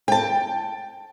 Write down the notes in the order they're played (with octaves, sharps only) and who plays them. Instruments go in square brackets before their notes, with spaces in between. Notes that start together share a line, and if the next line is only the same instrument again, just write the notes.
[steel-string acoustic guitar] G5 A5